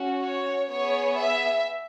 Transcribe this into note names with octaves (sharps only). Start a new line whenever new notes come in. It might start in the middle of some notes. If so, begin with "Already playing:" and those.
Already playing: C#4 F#4
C#5
B3 G#4 C#5
E5